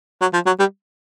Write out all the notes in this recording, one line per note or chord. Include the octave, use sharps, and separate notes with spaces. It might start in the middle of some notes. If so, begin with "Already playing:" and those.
F#3
F3
F#3
G3